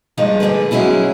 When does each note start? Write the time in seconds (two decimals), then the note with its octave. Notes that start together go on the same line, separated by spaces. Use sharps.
0.17 G2 F3 G#3 D4 D#4
0.40 G#2 D3 G#4 B4
0.71 F#3 G#3 C#4 E4 G#4